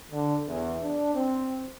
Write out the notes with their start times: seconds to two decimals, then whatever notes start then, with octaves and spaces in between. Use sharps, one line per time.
0.11 D3
0.47 E2
0.81 D4
1.15 C4